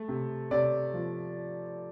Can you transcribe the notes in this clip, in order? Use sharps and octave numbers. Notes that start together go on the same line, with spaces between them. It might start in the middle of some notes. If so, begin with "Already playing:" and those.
Already playing: A3
C3
C3 D5
F3